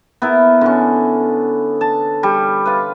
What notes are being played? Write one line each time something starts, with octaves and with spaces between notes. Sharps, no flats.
B3 E4 A#4
D3 C#4
A5
G3
F4 B4